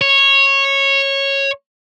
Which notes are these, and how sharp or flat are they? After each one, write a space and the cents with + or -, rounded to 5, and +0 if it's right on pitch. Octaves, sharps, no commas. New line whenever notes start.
C#5 -15